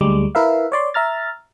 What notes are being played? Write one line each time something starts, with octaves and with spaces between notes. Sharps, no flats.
D2 G3 G#3 D6
E4 A#4 B4 E5 F5
C#5 D5 C6
E5 A#5 F6 A6